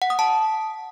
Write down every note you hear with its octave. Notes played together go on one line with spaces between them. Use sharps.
F#5
D#6
A5